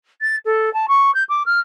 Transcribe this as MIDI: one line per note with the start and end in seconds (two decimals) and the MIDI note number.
0.21 0.36 93
0.45 0.72 69
0.73 0.86 81
0.88 1.13 85
1.14 1.23 91
1.29 1.43 86
1.46 1.59 89